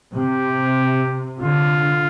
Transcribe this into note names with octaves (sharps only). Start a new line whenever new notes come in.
C3 G4
D3 F4